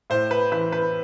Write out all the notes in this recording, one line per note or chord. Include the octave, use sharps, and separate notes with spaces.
A2 C5
B4
E3 B4
B4